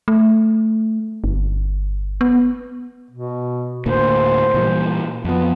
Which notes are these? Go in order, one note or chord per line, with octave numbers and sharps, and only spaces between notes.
A3
G1
B3
B2
D2 A2 A#3 C5
A#2 E3 G3
F2 F3 B3